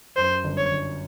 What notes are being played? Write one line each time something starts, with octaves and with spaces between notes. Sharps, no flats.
F#2 C5
G1
C#5
G1